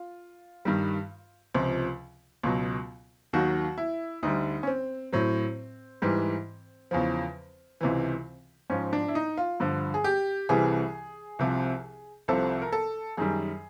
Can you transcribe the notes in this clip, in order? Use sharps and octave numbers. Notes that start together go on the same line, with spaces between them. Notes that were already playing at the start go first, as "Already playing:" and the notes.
Already playing: F4
G2 D#3 G3
C#2 C3 F3
C#2 B2 F#3
D#2 D#3 F#3 F#4
E4
D2 D3 G3 D#4
C#4
C4
A2 F#3 C4
G#2 E3 G3
E2 C#3 F3
C#2 C3 E3
G#2 F3 C#4
D4
E4
D#4
F4
G2 D3 F3
G#4
G4
C2 C3 E3 G3 G#4
C2 C3 F3
C2 C3 F3 A4
A#4
A4
F#2 D#3 G3 G#4